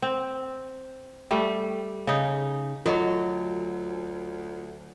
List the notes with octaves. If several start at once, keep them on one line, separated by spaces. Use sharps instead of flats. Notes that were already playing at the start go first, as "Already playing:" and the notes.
C4
G3 A3
C#3 D#4
D2 F#3 F4 A4 D#5 C#6